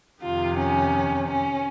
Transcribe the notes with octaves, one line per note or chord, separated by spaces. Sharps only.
F2 C3 D#3 F4
C#4
C#4